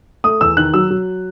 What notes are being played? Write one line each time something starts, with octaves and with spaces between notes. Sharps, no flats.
A3 D#6
E2 E6
D#3 F#6
F#3 E6
F#3